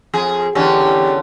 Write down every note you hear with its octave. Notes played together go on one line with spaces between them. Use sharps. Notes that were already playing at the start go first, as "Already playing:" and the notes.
F2 G#4
E2 D3 C#4 G4